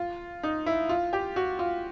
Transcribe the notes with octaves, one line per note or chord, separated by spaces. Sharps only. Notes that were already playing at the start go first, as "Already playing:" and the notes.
Already playing: F4
D#4
E4
F4
G4
F#4
F4